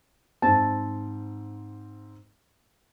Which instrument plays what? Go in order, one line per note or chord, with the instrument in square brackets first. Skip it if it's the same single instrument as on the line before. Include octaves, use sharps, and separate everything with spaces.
[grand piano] G#2 C4 [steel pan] A5